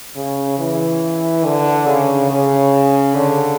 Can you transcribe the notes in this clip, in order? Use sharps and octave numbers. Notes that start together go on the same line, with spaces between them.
C#3
E3
D3
C#3
C#3
D3